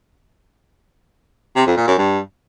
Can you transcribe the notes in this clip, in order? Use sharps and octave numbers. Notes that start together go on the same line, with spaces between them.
C3
F2
A#2
F#2
G2